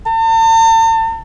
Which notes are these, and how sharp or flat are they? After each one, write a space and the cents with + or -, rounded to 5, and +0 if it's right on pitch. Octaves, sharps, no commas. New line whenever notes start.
A5 +45